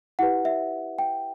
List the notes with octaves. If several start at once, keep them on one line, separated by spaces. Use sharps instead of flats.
E4 G4 B4 F#5
E5
G5